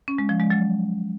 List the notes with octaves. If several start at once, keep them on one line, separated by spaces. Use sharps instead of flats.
C#4
G#3
F3
G#3
F#3